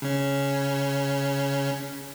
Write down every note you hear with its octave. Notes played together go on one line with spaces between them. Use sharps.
C#3 C#4